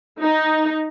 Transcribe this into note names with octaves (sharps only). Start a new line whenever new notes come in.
D#4